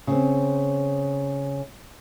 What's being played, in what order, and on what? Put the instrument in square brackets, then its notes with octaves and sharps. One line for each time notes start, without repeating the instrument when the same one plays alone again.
[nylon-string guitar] C#3 C4